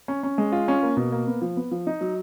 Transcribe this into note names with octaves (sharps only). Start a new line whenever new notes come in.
C#4
C#4
G#3
F4
C#4
A#3
B2
A#3
B3
F3
B3
F3
D#4
F#3